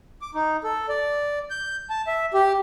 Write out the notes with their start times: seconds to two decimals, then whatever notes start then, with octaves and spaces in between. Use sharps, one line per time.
0.22 D6
0.35 D#4
0.64 A4
0.89 D5
1.50 G6
1.90 A5
2.07 E5
2.34 G4